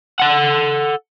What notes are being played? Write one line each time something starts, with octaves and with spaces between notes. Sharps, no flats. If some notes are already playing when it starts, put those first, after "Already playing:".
A4 F#5